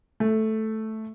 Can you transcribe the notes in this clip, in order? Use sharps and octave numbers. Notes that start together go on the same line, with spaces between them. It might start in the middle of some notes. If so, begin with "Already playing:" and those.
A3